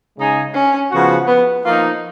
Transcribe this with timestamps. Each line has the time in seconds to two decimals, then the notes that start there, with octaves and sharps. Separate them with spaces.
0.17 C#3 G#3 D#4 G#4
0.54 C#4
0.91 C#3 F3 B3 F#4
1.27 B3
1.64 F3 A#3 D#4 F4